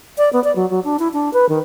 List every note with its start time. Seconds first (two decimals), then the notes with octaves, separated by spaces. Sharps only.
0.18 D5
0.33 B3
0.44 D5
0.56 F#3
0.70 F#3
0.84 D4
0.99 E4
1.13 D4
1.34 B4
1.49 D#3